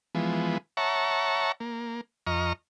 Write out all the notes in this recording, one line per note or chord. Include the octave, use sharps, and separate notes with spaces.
E3 F3 G#3 B3
C#5 E5 F#5 A5 A#5 C#6
A#3
F2 D#5 A#5 C#6 F6